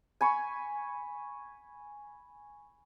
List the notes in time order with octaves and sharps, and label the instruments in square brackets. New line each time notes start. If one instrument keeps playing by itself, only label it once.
[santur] G#5 B5 C#6